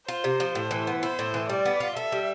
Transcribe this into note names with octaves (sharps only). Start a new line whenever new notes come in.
F4 C5
C3
F3
A2
E3
B3
E4 C5
A2
E3
G3 D5
B3
F4
A4 E5
G3